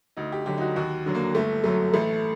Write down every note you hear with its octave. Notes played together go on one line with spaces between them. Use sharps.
D2 D#4
G4
D3 F#3 G4
D#4
F#4
D#2 F#4
D3 F#3
A#3
G1 A3
F#2 F#3 A3
A1 A3